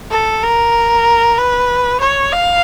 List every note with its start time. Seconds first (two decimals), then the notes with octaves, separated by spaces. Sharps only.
0.11 A4
0.43 A#4
1.38 B4
2.00 C#5
2.32 F5